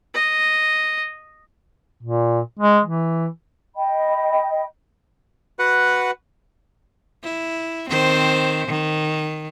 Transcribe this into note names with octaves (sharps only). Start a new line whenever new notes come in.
D#5
A#2
G#3
E3
D#5 G5 B5
F#4 B4 F#5
E4
D#3 C4 C5
D#3